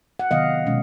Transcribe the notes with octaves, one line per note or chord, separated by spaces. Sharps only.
F#5
C3 D#3 F#3 B3 D#5 F5
B2 G#3 C#4